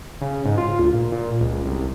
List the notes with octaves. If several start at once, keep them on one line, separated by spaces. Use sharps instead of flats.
C#3
G#2
F4
D2
A#2
A#2
C#2
C2